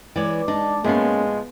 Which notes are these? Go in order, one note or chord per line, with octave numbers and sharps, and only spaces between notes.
E3 G#3 C#5 D5
G#3 D4 D#4
A2 F3 G#3 A#3 B3 C#4 F5